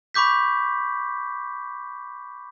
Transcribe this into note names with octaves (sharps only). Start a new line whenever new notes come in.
B5 C#6 D6 G6 B6